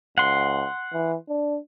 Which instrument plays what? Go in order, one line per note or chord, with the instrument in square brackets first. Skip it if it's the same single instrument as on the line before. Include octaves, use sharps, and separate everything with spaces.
[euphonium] C#2 [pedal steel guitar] F#5 C6
[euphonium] E3
D4